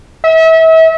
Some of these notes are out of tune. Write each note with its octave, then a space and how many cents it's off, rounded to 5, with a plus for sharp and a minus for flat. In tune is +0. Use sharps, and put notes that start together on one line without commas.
E5 -35